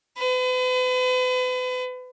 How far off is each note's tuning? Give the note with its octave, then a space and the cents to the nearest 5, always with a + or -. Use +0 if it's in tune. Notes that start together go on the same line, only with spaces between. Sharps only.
B4 +40